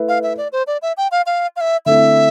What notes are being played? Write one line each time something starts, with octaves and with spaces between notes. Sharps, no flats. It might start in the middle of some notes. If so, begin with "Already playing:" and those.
Already playing: A3 E4 B4
F5
E5
D5
C5
D5
E5
G5
F5
F5
F5
E5
D3 A3 C4 E4 E5